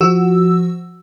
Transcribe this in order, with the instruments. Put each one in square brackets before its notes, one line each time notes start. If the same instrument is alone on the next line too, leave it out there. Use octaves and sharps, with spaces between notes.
[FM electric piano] F3 F#4 E6